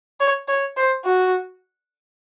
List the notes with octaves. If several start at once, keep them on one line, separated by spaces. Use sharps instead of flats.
C#5
C#5
C5
F#4